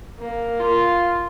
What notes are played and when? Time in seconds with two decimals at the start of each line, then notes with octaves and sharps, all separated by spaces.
0.18 A#3
0.60 F4